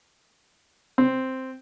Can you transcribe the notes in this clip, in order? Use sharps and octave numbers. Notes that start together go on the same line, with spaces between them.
C4